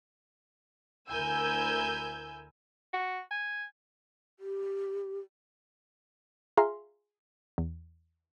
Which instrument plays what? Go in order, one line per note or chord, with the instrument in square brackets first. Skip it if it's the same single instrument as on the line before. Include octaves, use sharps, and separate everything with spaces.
[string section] D2 E4 A#4 G#5 E6 G6
[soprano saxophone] F#4
G#5
[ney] G4
[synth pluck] F4 G#4 E5 A#5 C6 F6
E2